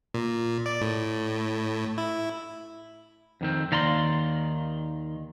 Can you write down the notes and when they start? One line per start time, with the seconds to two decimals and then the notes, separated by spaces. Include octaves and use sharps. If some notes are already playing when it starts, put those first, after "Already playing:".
0.14 A#2
0.66 D5
0.81 A2
1.98 E4
3.41 F2 D#3 C4
3.72 D#2 D#3 D5 F5 A#5 C6